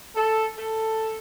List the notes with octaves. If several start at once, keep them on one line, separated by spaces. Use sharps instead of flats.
A4
A4